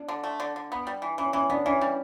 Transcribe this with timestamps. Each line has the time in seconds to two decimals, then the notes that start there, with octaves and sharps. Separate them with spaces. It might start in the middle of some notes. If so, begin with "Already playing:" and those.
Already playing: D4
0.08 D3
0.23 A3
0.40 D3
0.56 D3
0.72 B3
0.87 G3
1.02 E3
1.18 E3 C#4
1.33 E3 C#4
1.50 B3 D4
1.65 E3 C#4
1.81 G3